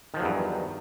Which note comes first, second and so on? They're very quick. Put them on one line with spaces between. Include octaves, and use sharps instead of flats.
D#3 F3 F#3 E2 G2